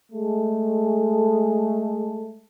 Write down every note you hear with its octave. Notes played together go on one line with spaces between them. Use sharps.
G#3 A3